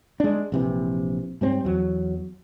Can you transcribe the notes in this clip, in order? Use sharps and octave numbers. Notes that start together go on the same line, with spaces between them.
G#3 D4
A#1 C3 E3
G#2 G3 C4 C#4
E2 F#3